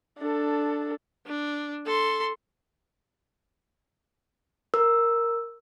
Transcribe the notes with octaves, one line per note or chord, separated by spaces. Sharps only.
D4 A4
D4
A4 C6
A#4 E6